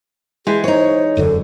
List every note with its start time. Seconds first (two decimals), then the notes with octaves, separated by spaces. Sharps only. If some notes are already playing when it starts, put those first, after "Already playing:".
0.47 E3 G#3 G4 G#4
0.64 D#4 C5 C#5
1.17 E1 F#2 D3 A4